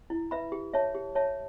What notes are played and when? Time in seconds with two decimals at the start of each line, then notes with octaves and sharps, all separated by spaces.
0.10 E4
0.31 B4 E5 B5
0.52 G4
0.73 C#5 E5 A5
0.95 G4
1.15 C#5 E5 A5